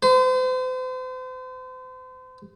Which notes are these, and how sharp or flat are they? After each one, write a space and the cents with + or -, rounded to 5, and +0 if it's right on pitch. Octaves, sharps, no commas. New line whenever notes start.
C5 -40